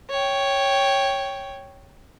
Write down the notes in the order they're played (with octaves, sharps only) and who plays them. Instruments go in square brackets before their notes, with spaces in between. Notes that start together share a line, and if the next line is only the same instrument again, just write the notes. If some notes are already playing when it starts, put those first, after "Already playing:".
[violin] C#5 G5